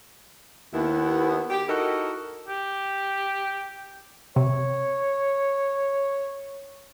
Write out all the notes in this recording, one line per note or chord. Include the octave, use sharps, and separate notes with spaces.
D#2 B3 E4
G4
D#4 E4 F#4 A4 A#4 D#5
G4
C3 C#5